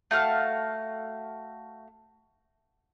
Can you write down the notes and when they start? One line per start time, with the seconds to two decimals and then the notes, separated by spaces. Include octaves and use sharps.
0.11 A3 F#4 F5 A5